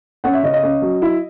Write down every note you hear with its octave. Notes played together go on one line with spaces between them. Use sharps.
C#4 F#5
E5
C#3 D#5
D#5
C#4
F#3
E4